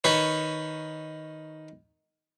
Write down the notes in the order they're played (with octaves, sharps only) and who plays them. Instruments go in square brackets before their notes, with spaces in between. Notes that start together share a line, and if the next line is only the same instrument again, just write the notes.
[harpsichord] D#3 B4 C#5